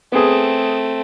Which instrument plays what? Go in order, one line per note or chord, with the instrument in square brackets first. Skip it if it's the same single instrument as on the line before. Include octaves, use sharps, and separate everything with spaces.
[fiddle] A3 C4 [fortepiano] B3 G#4